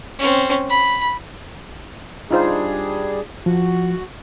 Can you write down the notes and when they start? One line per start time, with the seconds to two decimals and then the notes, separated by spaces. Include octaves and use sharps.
0.19 C4 C#4
0.70 B5
2.31 G3 D4 D#4 F4 G#4 C5
3.46 F3 F#4